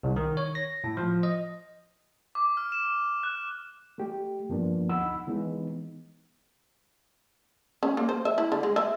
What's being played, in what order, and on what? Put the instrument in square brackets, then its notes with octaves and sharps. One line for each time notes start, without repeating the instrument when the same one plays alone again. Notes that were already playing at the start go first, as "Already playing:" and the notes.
[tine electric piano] C2
D#3
C#5
A#6
A2
F3
D#5
[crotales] D6
F6
E7
F#6
[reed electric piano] A3 G4
G2 F3 A#3 B3 D4
D2 D#4 F#5 B5 E6
E3 G#3 B3 D#4
[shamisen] C#4
A#3
C5
E5
E4
D3
G#3
E5